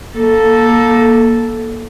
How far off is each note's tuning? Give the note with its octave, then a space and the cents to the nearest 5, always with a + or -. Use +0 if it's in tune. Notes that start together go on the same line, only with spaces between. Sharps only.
A#3 +20 A4 +0